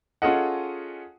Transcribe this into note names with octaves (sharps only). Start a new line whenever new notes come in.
C#4 F4 G#4 A4 D#5 F#5